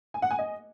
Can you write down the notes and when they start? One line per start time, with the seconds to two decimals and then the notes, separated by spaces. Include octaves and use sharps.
0.14 G#5
0.22 F#5
0.31 G#5
0.39 D#5